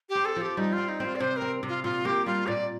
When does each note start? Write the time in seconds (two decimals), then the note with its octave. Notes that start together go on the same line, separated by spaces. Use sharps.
0.09 G4
0.15 C4
0.25 A4
0.36 F3
0.41 G4
0.57 G3 D#4
0.73 F4
0.78 C4
0.88 D#4
1.00 C4 F4
1.16 D5
1.20 C3 C5
1.37 A#4
1.42 C4
1.63 C3
1.68 F4
1.84 A#2 F4
2.05 A#3 G4
2.26 G3 F4
2.47 A#2 D5